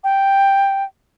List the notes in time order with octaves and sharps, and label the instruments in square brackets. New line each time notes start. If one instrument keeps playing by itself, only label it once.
[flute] G5